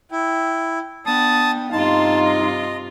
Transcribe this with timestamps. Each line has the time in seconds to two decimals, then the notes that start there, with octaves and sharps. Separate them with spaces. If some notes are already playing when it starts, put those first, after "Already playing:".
0.12 E4 G5
1.06 B3 D4 G5 A5 D#6
1.72 G2 C3 D#4 F4 F5 A5 C6
2.25 D#5